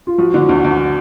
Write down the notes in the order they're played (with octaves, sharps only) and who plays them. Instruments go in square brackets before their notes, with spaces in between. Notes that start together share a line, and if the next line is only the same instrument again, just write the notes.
[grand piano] F4
[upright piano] F3 [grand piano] F#4
[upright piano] D3
D2
D2